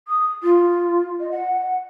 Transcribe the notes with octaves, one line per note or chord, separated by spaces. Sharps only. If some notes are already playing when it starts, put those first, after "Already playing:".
D#6
F4
D#5
F#5